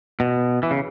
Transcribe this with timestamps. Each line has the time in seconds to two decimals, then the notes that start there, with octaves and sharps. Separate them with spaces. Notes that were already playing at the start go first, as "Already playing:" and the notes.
0.20 B2
0.63 E3
0.71 C#3